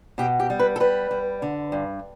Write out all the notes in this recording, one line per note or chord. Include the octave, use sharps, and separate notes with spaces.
B2 G4
G4
G3
B4
A4
G3 B4
G3
D3
G2